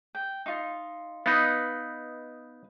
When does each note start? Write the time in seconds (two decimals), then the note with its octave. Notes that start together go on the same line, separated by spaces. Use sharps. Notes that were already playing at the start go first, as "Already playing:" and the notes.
0.15 G5
0.46 D#4 F4
1.26 B3 D#4 B4 D#5 F5